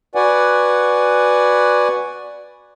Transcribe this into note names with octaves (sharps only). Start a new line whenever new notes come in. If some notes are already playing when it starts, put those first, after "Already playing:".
F#4 B4 D5 F#5 G#5